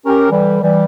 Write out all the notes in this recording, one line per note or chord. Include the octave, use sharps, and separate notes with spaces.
C#4 G4 A#4
D3 E3 G3
E3 G3